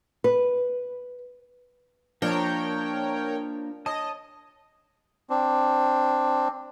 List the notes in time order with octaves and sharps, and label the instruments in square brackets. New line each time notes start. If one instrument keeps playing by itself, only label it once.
[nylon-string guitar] B4
[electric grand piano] F3 [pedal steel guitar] A#3 [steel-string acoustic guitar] D4 [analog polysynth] A#4 C#5 G5
[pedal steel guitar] C#5 A5 D#6 [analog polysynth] D#5
[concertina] C4 D4